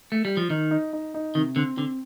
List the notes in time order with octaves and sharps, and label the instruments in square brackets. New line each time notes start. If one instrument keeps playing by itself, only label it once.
[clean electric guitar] A3
G3
F3
[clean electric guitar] D#3 [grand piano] D#4
[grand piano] D#4
D#4
D#4
[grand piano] C3 [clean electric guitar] D#3
[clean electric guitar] D3 [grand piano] C4
[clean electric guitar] D3 [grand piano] C4